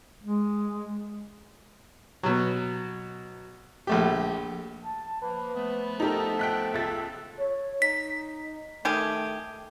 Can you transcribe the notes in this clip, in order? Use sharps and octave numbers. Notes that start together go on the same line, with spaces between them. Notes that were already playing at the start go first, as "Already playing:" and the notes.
G#3
B2 F#3
A#1 A3 G4
A5
F3 A#3 B4
F3 A3 B3
D#4 G4 A4 A#4
G5 F#6 B6
C#2 E5 A6
C#5
D#4 B6
D#3 A3 G4 G#4